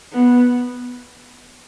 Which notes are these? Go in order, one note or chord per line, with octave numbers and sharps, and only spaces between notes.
B3